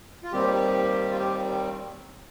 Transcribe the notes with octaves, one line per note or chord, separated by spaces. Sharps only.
F4
D#2 D#3 G3 C4 G4
G4
F4
G4